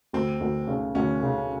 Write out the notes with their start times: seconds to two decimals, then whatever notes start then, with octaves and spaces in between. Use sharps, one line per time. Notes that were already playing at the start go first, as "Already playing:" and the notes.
0.13 D2 C4
0.40 D2
0.67 C#3
0.95 D2 C#4
1.23 C#3